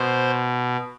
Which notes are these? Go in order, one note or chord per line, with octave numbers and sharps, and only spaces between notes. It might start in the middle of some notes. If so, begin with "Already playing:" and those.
Already playing: B2 C5